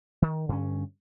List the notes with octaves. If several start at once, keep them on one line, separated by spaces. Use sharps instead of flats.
D#3
G2 D3 C#4